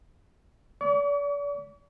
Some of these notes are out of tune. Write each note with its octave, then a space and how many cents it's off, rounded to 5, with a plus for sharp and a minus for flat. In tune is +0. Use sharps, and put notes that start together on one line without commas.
D5 -40 C#6 +45